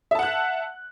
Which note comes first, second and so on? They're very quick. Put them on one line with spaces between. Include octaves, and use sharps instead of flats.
E5 A5 F#5 F#6